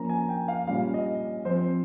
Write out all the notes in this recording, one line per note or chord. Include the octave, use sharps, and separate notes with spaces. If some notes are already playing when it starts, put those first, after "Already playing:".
Already playing: F3 A#3 C#4 A#5
G#5
G5
F5
A#2 G3 C#4 F5
D#5
F3 C4 C5